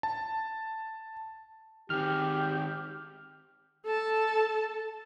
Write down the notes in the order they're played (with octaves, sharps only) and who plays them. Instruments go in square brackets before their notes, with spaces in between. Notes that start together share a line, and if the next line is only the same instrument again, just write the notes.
[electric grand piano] A5
[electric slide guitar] D#3 C4 [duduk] G4 [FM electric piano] F6
[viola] A4 A5